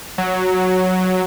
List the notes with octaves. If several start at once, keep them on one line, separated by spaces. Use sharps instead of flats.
F#3